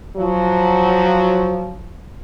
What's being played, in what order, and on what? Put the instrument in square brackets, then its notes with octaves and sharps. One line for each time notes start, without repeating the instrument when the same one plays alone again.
[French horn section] F3 F#3